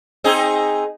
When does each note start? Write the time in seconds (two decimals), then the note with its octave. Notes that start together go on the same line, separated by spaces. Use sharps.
0.24 C4 D#4 G#4